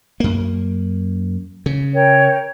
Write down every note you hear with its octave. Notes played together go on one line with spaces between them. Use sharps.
F#2 A#3
C#3
A#4 C#5 G5